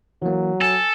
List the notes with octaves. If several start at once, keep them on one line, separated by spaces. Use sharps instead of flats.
E3 F#3 A#3
A4 G#5